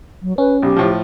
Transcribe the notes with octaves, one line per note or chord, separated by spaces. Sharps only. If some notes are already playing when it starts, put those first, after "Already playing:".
F#3
C#4 B4
B1 G4
A2 F3